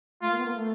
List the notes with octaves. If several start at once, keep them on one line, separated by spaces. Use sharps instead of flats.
A3 F4
A#3
B3
A#3
A3